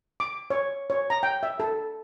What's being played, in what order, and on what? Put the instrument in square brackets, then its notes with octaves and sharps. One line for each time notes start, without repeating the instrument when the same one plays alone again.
[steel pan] D6
C#5
C#5
A#5
G5
E5
A4